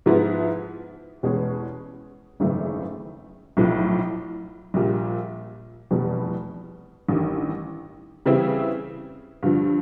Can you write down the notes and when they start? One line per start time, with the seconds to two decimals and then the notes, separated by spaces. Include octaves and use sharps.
0.06 G#2 F3 G#3 B3 E4
1.23 E2 B2 G#3 C#4
2.40 G#1 F#2 C#3 E3 A3
3.57 B1 A2 F3
4.74 A#1 A#2 G3
5.91 F1 E2 B2 G3
7.09 A1 G2 D#3
8.26 C#3 E3 G3 C4 E4
9.43 G2 D3 F3